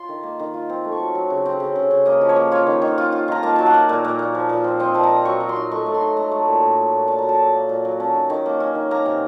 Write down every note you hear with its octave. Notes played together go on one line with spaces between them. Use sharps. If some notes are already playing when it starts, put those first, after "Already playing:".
Already playing: F4 C6
D#3
A#3
D#3
F4
C4
A3
C#6
F#3
F#3
C#3
C4
C#3
C#3
C#3
A#3 D#5
F3
C#5
A#3
F4 C#5
D#3
D#3
F4
F4
D#3 A#5
A#3 A5
F#3 A5
F#5
A#3
A#2
A#2
A#2
F3
A#2
C4
C4 D#5
A#2 A5
A#5
A#2
F#3 C#6
F#3
C6
D#4
A3 C#6
A3
C6
D#4
A3 A#5
A3
A#2
A#2
A3
A#2
A#2 A5
F#3 A#5
A5
F#3
A#3
A#2
F#3
C#4 A5
D#3
D#3
A#3
C#4
D#3
A#3 A#5
C3